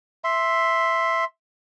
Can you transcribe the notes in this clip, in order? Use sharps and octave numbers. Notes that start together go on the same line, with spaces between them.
E5 C6